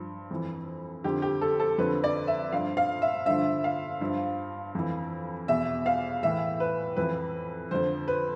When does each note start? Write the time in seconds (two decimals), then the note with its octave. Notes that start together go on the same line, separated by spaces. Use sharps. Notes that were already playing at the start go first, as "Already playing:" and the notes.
Already playing: G2 F3
0.31 F2 E3
1.04 F2 D3 F3 G4
1.22 G4
1.41 A4
1.60 A4
1.78 F2 D3 F3 B4
2.04 D5
2.27 E5
2.52 G2 F3 F5
2.77 F5
3.02 E5
3.26 G2 D3 F3 E5
3.64 F5
4.01 G2 F3
4.75 F2 E3
5.48 E2 B2 E5
5.86 F5
6.23 A2 E3 E5
6.60 B4
6.97 F2 E3 B4
7.71 F2 D3 F3 C5
8.08 B4